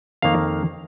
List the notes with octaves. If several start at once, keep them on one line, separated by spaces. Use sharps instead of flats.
F2 D#3 A#3 F5